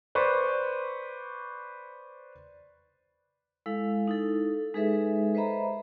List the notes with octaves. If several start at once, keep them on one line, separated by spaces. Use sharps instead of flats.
B4 C5 D5 C#6
G#3 E4 A4 F5
D#4 E4 A4
G#3 D#4 G#4 A4 B4 E5
B4 C5 D#5 E5 A#5 B5